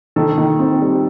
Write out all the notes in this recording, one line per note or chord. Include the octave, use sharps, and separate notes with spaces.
D#3 A4
D#3
C4
G3